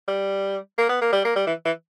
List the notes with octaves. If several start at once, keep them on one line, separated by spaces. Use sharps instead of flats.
G3
A#3
B3
A#3
G3
A#3
G3
E3
E3